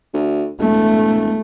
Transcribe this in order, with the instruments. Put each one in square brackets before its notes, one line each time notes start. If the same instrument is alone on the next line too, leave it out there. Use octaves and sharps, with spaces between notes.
[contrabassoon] D2
[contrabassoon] E1 [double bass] A3